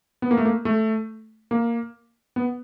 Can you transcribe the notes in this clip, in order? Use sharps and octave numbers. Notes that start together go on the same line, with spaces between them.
B3
A#3
A3
A#3
A3
A#3
B3